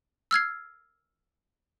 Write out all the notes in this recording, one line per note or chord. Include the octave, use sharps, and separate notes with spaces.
E6 F6 G#6 C7